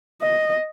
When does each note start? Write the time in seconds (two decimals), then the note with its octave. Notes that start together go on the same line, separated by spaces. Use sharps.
0.22 D#5